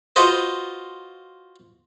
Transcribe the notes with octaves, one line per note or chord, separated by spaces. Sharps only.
F4 F#4 B4 C5 D#5